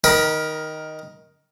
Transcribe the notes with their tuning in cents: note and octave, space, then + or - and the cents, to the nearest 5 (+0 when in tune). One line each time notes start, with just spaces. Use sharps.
D#3 +0 A#4 +10 B5 -30